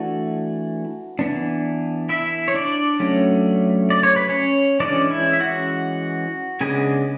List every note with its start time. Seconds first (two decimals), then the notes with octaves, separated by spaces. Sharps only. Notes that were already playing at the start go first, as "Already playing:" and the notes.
Already playing: E3 A3 D4 F#4
1.19 E3 B3 D4
2.09 E4 E5
2.48 C#5
2.54 D4 D5
3.00 F#3 A3 C#4
3.90 D5
4.03 C#5
4.16 B4
4.29 C#4 C#5
4.80 E3 G#3 C#4 D4 D5
5.11 E4 E5
5.33 E5
5.40 F#4 F#5
6.61 C#3 G#3 B3 D4 G#4 G#5